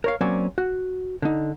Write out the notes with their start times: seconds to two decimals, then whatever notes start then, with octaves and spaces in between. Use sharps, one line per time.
0.04 A#4 C#5 F5
0.21 F#3 A#3 C4 C#4 D5 G#5
0.58 F#4
1.22 D3 D#4